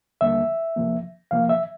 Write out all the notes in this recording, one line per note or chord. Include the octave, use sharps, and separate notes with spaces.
D#2 D3 G3 A#3 E5
C2 C3 F3 A#3
C2 C3 F3 A#3 F5
E5